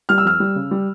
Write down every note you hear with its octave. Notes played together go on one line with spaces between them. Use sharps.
G3 F6
E6
F2 F6
G3
C#3
G3